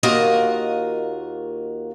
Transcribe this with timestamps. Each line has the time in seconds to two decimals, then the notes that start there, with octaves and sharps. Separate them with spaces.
0.03 D#2 A#3 F4 F#4 A#4 D#5